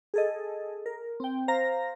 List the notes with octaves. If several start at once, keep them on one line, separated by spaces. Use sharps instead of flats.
G#4 A4 D#5
A#4
C4 G5
C5 F5 A#5 A#6